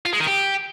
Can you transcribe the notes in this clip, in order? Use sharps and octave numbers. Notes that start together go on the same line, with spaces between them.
F4
G#3
D#3
G4